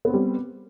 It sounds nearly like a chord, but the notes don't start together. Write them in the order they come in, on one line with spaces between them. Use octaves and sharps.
B3 C4 G3